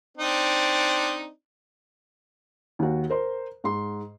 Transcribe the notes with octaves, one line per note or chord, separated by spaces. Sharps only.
C4 D4 D#4
D#2 F#4
A#4 C5 C6
G#2 C6